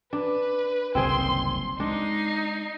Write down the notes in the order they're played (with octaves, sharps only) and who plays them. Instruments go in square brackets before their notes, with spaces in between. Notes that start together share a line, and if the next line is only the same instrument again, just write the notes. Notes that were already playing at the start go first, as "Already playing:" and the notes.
[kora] D4 [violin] B4
[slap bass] F#1 C2 D#3 [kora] C4 G#4 G5 [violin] C6
[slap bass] G#3 [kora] D4 [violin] D#4 C7